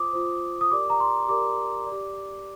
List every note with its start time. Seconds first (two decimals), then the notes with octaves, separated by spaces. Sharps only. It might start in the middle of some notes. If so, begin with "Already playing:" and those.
Already playing: F4 C5 D6 D#6
0.13 F4 C5
0.61 D#6
0.71 G4 A#4 D5 D6
0.90 A#5
1.00 C6
1.28 G4 A#4 D5 D6
1.86 D5
1.92 G4